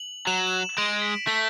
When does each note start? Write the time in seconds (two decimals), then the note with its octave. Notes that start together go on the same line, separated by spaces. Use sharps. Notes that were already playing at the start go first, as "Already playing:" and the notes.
Already playing: F#7
0.27 F#3 E7
0.38 F#7
0.47 E7
0.77 G#3 D7
1.02 B6
1.27 A3 B6